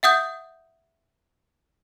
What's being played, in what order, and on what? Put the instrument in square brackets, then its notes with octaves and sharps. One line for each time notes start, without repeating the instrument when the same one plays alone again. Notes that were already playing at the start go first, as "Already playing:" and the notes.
[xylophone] E5 F#5 D#6 G6